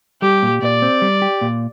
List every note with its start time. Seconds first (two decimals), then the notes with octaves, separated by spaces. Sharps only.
0.22 G3 G4
0.43 A#2
0.62 A#2 D5
0.82 C4
1.02 G3
1.22 G4
1.41 A#2